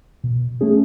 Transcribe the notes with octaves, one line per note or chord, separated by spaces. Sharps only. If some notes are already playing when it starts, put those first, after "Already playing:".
B2
A3 C#4 G#4